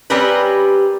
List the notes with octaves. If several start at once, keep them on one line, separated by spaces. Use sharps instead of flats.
G3 C4 C#4 G4 A#4 B4